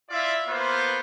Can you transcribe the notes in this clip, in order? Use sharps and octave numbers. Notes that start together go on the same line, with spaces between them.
E4 F4 D5 E5 F5
A#3 B3 F4 C5